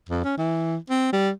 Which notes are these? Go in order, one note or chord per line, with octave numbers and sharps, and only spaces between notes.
F2
C#4
E3
C4
G3